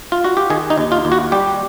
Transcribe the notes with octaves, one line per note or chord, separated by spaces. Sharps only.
F4
F#4
G4
D#3 G#4
D#4
D#2
F4
D#2
F#4
G3 G4